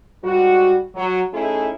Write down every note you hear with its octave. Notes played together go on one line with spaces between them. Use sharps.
G#2 G3 F#4
F#3
A3 C#4 D#4 E4 G#4